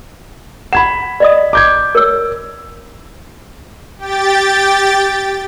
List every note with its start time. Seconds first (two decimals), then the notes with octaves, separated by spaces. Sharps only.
0.73 F#5 B5 G#6 E7
1.20 D5 D#5 D#6
1.53 D6 G6 G#6
1.95 A#4 C#5 E6
3.98 G4 G5 A6